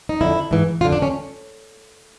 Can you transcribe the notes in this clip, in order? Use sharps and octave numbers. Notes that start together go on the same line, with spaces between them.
D#4
F2 D3 E4
G#2 E3
F2 D3 F4
D4
C#4